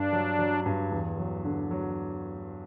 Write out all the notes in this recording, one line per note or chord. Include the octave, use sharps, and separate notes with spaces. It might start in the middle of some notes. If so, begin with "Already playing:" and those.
Already playing: G2 D4
F#3
F#3
G2
E2
F#3
D3
F#3